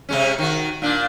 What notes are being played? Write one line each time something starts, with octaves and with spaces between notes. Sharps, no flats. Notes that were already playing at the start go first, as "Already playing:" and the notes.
C3 G#3 C#4
D#3 F#4
A#2 D4